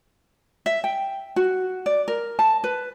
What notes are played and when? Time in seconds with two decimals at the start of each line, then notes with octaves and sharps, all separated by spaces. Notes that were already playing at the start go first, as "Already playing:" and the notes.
0.66 E5
0.84 G5
1.36 F#4
1.86 D5
2.08 A#4
2.39 A5
2.64 B4